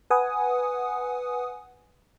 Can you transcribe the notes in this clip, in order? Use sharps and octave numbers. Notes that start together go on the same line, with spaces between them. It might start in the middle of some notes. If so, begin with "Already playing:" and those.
B4 F#5 G#5 D#6